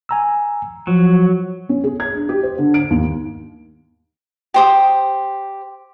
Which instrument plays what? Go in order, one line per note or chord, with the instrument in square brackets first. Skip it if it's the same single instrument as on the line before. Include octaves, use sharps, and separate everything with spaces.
[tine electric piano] G#5 A#5 E6
[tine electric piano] F3 [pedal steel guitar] F#3
[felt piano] C#4
G#4
G#6
D4
G4
C5
D3
D7
D#2
[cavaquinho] G4 C5 D#6